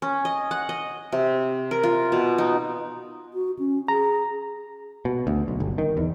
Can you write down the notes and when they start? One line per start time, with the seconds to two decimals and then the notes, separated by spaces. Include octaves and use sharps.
0.02 C#4
0.25 D#5
0.51 F#5
0.69 D#5
1.12 C3
1.71 A#4
1.83 F4
2.12 B2
2.38 D#4
3.33 F#4
3.59 C#4
3.88 G#4 A#5
5.05 B2
5.27 D2
5.48 B1
5.60 G1
5.78 D#3
5.97 E2